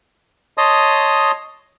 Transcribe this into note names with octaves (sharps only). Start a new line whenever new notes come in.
C#5 D#5 A5 C6 D#6